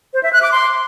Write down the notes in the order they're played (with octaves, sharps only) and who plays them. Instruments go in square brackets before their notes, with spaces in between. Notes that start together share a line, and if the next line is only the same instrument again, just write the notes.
[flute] C5
E5
F#6
D6
C6